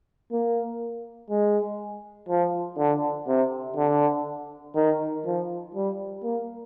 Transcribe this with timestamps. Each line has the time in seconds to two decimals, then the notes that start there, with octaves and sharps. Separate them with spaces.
0.32 A#3
1.30 G#3
2.29 F3
2.78 D3
3.27 C3
3.76 D3
4.75 D#3
5.25 F3
5.75 G3
6.23 A#3